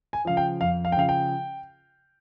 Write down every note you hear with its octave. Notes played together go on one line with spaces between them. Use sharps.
G#5
C#3 F3 F5
G5
F2 F5
F5
G5
C#3 F3 F5
G5